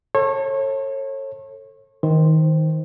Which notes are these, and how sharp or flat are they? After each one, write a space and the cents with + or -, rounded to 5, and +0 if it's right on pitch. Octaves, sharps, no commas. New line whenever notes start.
A4 +20 C#5 -30
D#3 +20 C5 +0